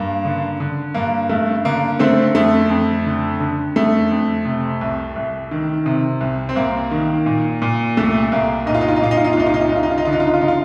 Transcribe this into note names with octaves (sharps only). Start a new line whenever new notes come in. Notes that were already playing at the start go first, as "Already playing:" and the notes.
Already playing: G2 A#3
D3
D3
G2 A#3
G2 A3
D3 A#3
D3 A3 C4
F2 A3
F2
D3
D3
F2 A3
F2
C3
C2
C2
D#3
C3
C2
C4
C2 A#3
D#3
A#2
A#2
C2 A3
C2 A#3
A#2 D#4
F4
D#4
F4
D#4
A#2 F4
D#4
F4
D#4
F4
C2 D#4
F4
D#4
F4
D#4
C2 F4
D#4
F4
D#4
D3 F4
D#4
F4
D#4
F4
D3 D#4
F4